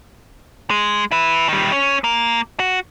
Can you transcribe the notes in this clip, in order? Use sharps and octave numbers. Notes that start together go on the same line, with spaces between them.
G#3
E4 B4
D#3 G3
C#4
A#3
F#4